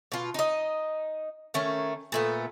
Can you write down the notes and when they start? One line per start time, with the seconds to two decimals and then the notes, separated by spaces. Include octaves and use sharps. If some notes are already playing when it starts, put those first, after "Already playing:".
0.12 B2 F4
0.34 D#4 D#5
1.54 D#3 A3 C#4
2.12 A#2 A3 B3